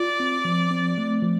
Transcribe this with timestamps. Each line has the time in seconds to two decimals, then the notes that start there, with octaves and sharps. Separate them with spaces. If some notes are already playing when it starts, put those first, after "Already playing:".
Already playing: F4 D5
0.20 C4
0.45 F3
0.71 C4
0.98 A3
1.23 F3